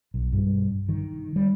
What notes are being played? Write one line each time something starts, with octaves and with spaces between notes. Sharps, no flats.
B1
G2
D#3
G3